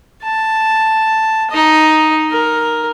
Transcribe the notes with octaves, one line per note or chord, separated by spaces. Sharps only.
A5
D#4 D#5
A#4